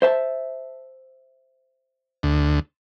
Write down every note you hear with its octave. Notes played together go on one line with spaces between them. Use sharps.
C5 E5 A5
D2